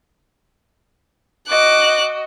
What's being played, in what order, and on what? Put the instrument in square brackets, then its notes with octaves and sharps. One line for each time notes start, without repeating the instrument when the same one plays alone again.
[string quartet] F#4 D#5 [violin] D6 F#6